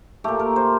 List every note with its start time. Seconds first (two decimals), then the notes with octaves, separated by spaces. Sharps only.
0.24 A#2 A3 G4
0.39 A#4
0.56 C5